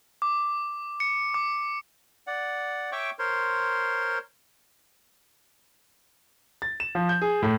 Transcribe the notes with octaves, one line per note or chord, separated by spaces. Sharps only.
D6
C#7
D6
D5 F#5
C#5 E5 G5 C#6 D6
A#4 C5 C#5 C6
A6
E7
F3
G6
G#4
A2